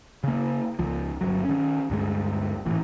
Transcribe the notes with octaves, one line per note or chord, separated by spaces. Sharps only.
C#3 A#3
C#2 F3
G1 C#2 F#3
D#3 C#4
D2 G2 F#3 G#3
G#1 A2 E3